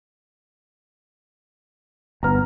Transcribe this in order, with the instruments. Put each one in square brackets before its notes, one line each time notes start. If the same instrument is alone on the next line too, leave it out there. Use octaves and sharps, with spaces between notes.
[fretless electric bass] G1 B3 [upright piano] A#5 F6